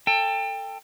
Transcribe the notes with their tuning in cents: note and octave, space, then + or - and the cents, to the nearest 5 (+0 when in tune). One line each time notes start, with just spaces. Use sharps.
A4 +20 G5 +25